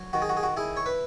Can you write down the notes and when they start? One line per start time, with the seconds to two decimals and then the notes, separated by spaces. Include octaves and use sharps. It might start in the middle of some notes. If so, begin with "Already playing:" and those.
Already playing: F#3
0.13 D#3 F#4
0.22 G#4
0.29 F#4
0.37 G#4
0.43 F#4
0.57 E4 G#4
0.77 C#5
0.86 B4